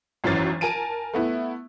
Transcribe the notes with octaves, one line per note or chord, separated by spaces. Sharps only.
G#1 F#2 E3 C#4 A6
A#4 G#5 A5 D7 D#7
A3 B3 E4